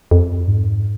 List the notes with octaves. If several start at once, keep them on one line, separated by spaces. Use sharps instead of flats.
F2
G#2